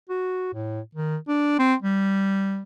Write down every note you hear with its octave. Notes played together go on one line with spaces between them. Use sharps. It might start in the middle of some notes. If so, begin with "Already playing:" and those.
F#4
A2
D#3
D4
C4
G3